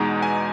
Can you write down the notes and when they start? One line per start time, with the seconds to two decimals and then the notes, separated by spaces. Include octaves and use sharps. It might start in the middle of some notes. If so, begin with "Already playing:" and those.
Already playing: E2 B2 G#3 D#4 A#5
0.23 G#5